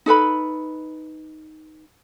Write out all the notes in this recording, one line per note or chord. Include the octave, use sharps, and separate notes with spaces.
D#4 A4 B4 B5